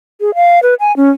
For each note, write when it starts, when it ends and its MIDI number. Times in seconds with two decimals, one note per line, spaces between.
0.21 0.35 68
0.35 0.60 77
0.63 0.74 71
0.80 0.95 80
0.97 1.10 61